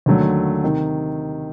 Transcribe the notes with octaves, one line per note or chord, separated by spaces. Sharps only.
D#2 D3 F#3 A3
C3 D#3